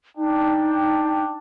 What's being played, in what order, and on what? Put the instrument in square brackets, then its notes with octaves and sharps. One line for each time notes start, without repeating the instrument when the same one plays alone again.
[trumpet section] D4 G5 [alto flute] D#4